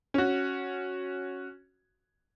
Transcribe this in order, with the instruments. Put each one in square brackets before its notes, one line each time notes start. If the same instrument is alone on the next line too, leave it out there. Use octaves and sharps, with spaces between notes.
[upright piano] C#4 F#4